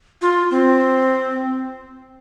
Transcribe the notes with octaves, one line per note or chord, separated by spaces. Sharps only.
F4
C4